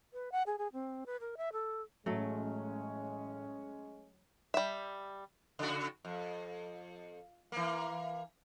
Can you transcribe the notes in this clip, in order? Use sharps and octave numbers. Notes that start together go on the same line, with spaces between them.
B4
F#5
G#4
G#4
C4
B4
A#4
E5
A4
A1 F#3 G#3 A3 C#4
G3 E5
C#3 F#4
F2
E3 A#3